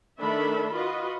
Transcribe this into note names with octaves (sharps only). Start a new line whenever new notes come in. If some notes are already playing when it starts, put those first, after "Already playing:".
D#3 A3 D4 A4 E5 B5
F4 F#4 B4 D#5